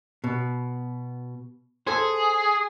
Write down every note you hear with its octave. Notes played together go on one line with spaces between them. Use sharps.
B2
G#4 A4 C5